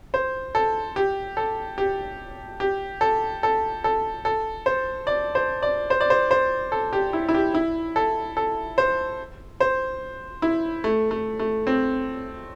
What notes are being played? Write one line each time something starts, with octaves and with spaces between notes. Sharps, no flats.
C5
A4
G4
A4
G4
G4
A4
A4
A4
A4
C5
D5
C5
D5
C5
D5
C5
C5
A4
G4
E4
E4
G4
E4
A4
A4
C5
C5
E4
A3
A3
A3
C4